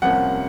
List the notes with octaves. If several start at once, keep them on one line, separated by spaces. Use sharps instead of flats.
C2 C3 F3 A#3 C#4 F#5